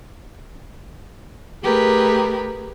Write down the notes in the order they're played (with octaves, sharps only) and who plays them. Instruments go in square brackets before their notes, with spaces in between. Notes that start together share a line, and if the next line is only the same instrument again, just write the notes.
[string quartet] A3 G4 G#4 A#4 B4